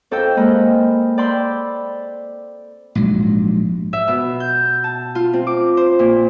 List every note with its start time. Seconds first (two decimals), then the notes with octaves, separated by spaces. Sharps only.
0.11 F2 A4 C5 D#5 G5 E6
0.36 G#3 A#3 D#5 B5 F6 F#6
1.18 D5 G5 B5 C6 D6 E6
2.95 A#1 G#2 F#3
3.93 E5
4.08 B2
4.40 G6
4.84 A5
5.15 F4
5.33 C4
5.47 D6
5.77 C5
5.99 A#2